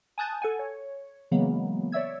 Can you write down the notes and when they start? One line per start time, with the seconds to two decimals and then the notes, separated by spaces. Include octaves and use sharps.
0.18 G#5 A5 D#6 F#6 G6 A6
0.42 A4 F#5 G#5
0.59 C#5
1.31 C#3 E3 F#3 G#3 A#3 B3
1.92 C#5 D5 E5 E6 G#6